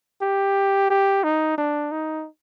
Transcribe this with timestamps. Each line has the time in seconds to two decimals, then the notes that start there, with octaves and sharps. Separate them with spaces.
0.22 G4
0.90 G4
1.24 D#4
1.58 D4
1.91 D#4